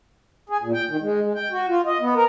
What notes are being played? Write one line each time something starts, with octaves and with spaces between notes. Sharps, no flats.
G#4
A#2
G5
D#3
G#3
G#3
G5
F#4
F4
D#5
B3
A#4